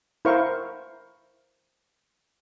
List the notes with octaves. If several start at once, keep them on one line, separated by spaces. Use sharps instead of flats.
E4 A#4 C5 F5 C#6